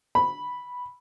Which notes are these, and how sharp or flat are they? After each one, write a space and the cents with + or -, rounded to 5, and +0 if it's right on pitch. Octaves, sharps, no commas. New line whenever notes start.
B5 -5